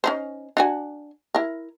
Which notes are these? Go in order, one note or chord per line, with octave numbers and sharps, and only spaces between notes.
C#4 D#4 C5
D4 F#4 G#5
E4 A#4